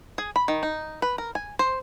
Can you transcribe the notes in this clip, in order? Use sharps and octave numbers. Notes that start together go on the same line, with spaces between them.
G#4
B5
D#3
D#4
B4
A#4
G#5
C5